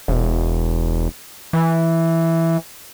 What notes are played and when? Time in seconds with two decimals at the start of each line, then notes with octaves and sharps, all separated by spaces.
0.08 E1
1.53 E3